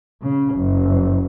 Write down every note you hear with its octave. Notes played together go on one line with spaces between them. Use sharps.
C#3
F#1